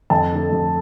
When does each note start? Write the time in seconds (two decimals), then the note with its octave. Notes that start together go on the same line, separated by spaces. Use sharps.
0.10 F2 A5
0.32 D3 A3
0.52 F2